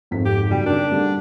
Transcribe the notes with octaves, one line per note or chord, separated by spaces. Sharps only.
G#1 F2 B6
G4
F#1 G3 F#4 G5
D4 A#4
D3 G3 A3